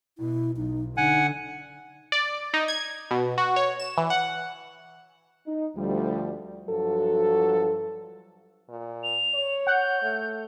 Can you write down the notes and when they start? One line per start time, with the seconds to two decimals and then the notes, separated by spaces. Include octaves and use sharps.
0.18 B2 E4
0.57 B1 D#4
0.97 D3 D#4 F#5 G#5
2.12 D5
2.54 D#4
2.68 G#6
3.11 B2
3.38 F#4
3.56 C#5
3.80 E7
3.98 E3
4.10 F#5
5.47 D#4
5.77 D2 F3 G3
6.68 G2 F3 F#3 F#4 A4
8.69 A#2
9.03 F7
9.34 C#5
9.67 F#5 G6
10.02 A3